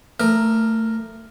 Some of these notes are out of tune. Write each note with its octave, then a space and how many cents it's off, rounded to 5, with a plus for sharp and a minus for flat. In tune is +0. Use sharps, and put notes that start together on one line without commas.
A3 +20 A#4 +0 D6 +45